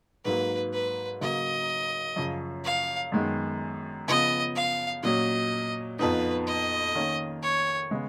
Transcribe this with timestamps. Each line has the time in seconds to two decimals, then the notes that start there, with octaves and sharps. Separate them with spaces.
0.24 G#2 F#3 A#3 B4
0.73 B4
1.21 C#3 F#3 A#3 D#5
2.16 F#2 C#3 F3
2.64 F5
3.12 F#2 D#3 G#3 B3
4.08 C#3 F3 B3 D#5
4.55 F5
5.03 A#2 F#3 C#4 D#5
5.99 F2 F3 B3 D#4 B4
6.47 D#5
6.95 D#3 A#3 C#4
7.42 C#5
7.91 C#3 G#3 B3